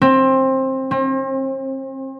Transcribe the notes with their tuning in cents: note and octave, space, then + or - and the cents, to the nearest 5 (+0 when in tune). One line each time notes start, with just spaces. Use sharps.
C4 +20
C4 +40